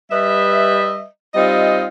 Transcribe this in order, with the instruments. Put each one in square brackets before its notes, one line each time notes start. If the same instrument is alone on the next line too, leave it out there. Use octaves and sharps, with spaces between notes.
[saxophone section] G3 B4 D#5 E5
G3 C4 D#4 F4 D#5